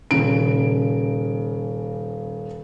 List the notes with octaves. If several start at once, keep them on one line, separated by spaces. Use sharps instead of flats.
D#1 C#3 D7